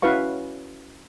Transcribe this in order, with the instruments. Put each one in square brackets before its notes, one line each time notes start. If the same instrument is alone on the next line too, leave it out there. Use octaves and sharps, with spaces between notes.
[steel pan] C#4 E4 F#4 B4 F5 C#6